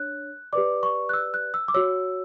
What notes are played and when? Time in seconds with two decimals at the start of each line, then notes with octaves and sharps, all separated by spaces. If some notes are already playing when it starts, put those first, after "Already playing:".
Already playing: D4 C#5 F#6
0.53 G4 B4 D5 D6
0.83 C#6
1.09 F#6
1.13 E6
1.34 F#6
1.54 E6
1.68 D6
1.74 F#4 C#5 E6